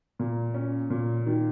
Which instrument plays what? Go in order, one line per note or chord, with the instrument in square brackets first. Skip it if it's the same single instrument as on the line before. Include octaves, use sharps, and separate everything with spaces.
[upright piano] A#2
C#4
A#2
D#3